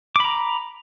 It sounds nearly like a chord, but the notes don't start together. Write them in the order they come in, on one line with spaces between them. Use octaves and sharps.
D6 B5 A#5